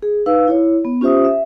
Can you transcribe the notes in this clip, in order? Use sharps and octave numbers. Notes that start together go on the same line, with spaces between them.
G#4
D#4 B4 F5 E6
E4 C#5
B3
C#4 F4 G4 C5 E5 D#6
E5